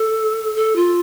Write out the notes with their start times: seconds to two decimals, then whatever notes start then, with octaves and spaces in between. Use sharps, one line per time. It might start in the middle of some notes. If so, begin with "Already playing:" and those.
Already playing: A4
0.56 A4
0.76 F4